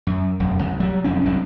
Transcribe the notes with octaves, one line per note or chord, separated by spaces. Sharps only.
F#2
E1 F#2
C2
F#3 G3
C2 F2 C4 C#4
C2 G2 F#3 C4